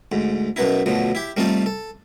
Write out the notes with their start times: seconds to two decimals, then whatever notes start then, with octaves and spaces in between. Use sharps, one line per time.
0.12 D2 G#2
0.56 F#2 B2 B3 D#4 E4
0.86 D2 B2 F3 F#3
1.15 E4 G4
1.37 G3 A3 C4 D#4 F4 A4
1.66 A4